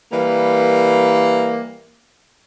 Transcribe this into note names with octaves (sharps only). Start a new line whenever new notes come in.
E3 G3 A#3